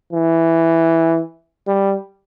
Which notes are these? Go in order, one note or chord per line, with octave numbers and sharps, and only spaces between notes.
E3
G3